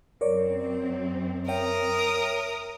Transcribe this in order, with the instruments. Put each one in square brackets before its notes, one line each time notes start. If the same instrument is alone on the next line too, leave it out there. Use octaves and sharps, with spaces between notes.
[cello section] F#2 C4 [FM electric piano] A#4 C#5 D5
[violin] A#4 D#6 [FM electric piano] C#5 E5 G5